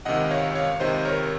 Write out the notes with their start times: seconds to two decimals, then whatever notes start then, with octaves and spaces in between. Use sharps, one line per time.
0.05 C#2 C3 D#3 D#5 F#5
0.30 C#5 F5
0.55 C#5 F5
0.80 C#2 C3 D#3 C5 D#5
1.05 A#4 C#5